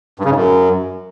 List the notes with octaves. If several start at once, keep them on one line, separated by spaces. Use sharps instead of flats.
G2
C#3
G#2
F#2